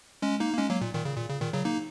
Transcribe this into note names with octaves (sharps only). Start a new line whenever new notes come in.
G#3 C#4
A#3 D#4
A#3
G#3 C#4
F#3 A#3
A#2
A#2 D#3
C#3
A#2
C#3
A#2 D#3
C#3 F#3
A#3 D#4